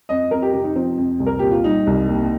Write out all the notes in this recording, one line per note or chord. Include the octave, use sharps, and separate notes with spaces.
F2 D#5
F2 A#4
G4
C3 G4
D#4
F3 C4
F2
C2
A#4
A#2 G4
F4
G3 D#4
C2
D#2